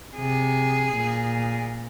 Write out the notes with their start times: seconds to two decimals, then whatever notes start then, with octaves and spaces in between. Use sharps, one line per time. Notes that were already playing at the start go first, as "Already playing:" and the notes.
0.16 C3 G#4
0.93 A#2